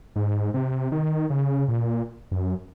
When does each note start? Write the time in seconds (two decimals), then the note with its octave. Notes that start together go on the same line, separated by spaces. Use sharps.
0.16 G#2
0.54 C3
0.92 D#3
1.30 C#3
1.68 A#2
2.31 F#2